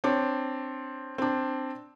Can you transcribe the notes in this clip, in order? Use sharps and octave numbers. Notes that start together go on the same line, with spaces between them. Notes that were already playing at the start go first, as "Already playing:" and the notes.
C4 D4 C#5
C4 D4